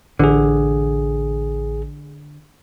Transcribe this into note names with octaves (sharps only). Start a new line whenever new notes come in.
A1 D3 G#4